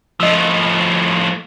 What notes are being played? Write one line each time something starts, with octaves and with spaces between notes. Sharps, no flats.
A2 F3 D#5 E6